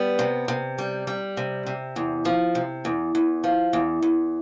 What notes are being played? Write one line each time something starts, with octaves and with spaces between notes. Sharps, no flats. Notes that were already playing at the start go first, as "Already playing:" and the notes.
Already playing: G3 B3
C3
C3
G3
G3
C3
C3
E2
F3
C3
E2
E2
F3
E2
E2